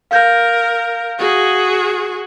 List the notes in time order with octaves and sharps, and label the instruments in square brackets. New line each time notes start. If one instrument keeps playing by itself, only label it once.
[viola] A#4 [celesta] F5 G6 A#6
[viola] F#4 G#4